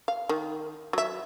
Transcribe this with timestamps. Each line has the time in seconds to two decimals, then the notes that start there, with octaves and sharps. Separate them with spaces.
0.08 F5
0.29 D#3
0.93 F#3 E5